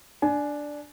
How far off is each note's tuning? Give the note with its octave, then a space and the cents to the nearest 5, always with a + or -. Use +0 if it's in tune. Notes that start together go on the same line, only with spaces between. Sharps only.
D4 +0 G#5 +25